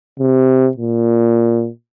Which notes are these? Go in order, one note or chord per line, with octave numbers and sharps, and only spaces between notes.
C3
A#2